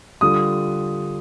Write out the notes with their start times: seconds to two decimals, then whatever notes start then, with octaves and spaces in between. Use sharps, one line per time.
0.21 D3 G3 D4 F4 D#6